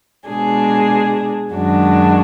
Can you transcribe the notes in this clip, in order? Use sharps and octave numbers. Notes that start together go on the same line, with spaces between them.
B2 G#3 D4 G#4
F#2 D#3 G#3 D4 F#4